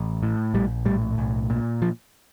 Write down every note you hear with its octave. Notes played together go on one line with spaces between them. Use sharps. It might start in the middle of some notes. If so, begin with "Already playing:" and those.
Already playing: A1
A2
A#1 G3
A2 G3
B1
A#2
F3